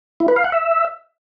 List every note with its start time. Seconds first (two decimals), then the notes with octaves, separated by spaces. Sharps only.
0.20 E4
0.28 B4
0.36 F5
0.44 F#5
0.52 E5